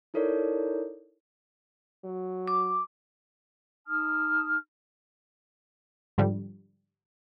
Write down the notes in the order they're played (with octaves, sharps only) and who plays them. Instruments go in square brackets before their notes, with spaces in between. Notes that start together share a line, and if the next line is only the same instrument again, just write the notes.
[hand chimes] D#4 E4 A4 A#4 C#5 D5
[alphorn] F#3
[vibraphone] D6
[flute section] D#4 A5 D#6 F6
[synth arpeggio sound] G#2 D3 F3 G3